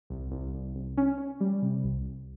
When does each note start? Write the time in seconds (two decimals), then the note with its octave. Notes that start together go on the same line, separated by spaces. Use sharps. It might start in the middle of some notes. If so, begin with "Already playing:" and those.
0.10 C2
0.31 C2
0.54 C2
0.75 C2
0.97 C#4
1.18 C#4
1.40 G3
1.62 C3
1.84 C2
2.06 C2